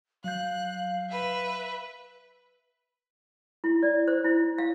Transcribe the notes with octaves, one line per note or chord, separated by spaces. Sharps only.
F#3 F5 F#6 G6
B4 E5
E4
D5
C5
E4
F5